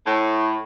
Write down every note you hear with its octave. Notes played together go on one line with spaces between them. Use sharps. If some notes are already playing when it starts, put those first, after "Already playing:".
A2